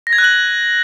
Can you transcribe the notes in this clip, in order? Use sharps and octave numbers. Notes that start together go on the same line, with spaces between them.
A#6
G#6
F#6
F#7